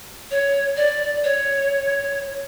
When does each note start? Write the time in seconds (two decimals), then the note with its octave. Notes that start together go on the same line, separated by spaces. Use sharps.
0.31 C#5
0.77 D5
1.24 C#5